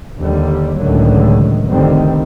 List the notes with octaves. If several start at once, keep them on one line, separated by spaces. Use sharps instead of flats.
D#2 D3 G3
C#2 A2 D3 D#3 F#3
F1 C2 D3 D#3 G3 C4